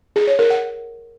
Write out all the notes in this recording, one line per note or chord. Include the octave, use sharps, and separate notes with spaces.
G#4
C#5
A#4
F#5